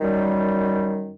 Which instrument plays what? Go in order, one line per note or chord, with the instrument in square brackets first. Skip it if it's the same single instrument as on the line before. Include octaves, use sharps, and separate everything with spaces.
[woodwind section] F#2 D#3 G3